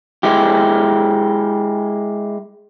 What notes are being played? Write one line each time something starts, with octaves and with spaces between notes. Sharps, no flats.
G#3 E4 G4